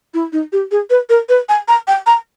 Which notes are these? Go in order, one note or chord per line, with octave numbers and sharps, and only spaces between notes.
E4
D#4
G4
G#4
B4
A#4
B4
G#5
A#5
G5
A#5